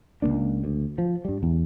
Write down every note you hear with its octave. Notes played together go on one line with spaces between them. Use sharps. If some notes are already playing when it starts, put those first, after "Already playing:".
C#2 A2 A#3 D4
D2
F3
G2 G3
E2